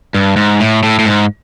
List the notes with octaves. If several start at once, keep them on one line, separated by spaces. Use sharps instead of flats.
G2
G#2
A2
A2
A2
G#2